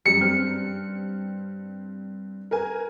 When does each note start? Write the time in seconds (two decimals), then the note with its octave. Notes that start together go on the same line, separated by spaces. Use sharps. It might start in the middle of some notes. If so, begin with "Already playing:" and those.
0.06 F#2 G3 C#7
0.21 G2 C4 F6
2.51 A#4 B4 G#5